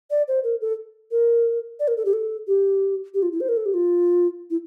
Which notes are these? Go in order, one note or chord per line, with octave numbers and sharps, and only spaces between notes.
D5
C5
A#4
A4
A#4
D5
A#4
A4
G4
A4
G4
G4
F4
E4
C5
A#4
A4
G4
F4
E4